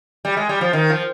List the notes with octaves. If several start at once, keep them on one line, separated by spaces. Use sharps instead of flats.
G3
G#3
G3
F3
D#3
F3